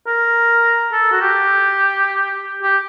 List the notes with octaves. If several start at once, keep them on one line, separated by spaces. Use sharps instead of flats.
A#4
A4
F#4
G4
G4